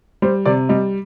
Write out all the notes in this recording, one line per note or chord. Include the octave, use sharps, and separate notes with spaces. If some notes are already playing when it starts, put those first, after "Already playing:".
G3 C5
C3 D5
G3 D#5